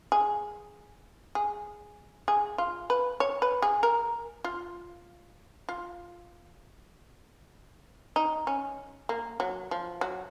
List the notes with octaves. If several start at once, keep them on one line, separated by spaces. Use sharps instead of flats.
G#4
G#4
G#4
F4
B4
C#5
B4
G#4
A#4
F4
F4
D#4
C#4
A#3
F#3
F3
F#3